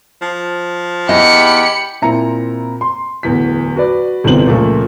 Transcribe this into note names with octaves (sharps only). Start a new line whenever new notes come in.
F3
E2 G4 D#5 B5 C#7
A#2 C4 E4 A#5 C#7
C6
D1 E2 B6
F#4 B4 D5
G1 E2 C3 C5 F#7
C#2 A#2 F3 A3